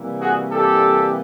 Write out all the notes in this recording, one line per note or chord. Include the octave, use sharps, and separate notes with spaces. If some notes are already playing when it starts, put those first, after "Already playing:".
Already playing: C3 E3 G3 A#3
F#4 G#4
G4 A4